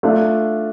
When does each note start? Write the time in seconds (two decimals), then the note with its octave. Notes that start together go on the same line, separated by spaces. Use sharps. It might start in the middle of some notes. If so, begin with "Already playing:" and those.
0.03 A3 D4 F4